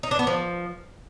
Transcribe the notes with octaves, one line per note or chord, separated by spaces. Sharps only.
D#4
D4
B3
F3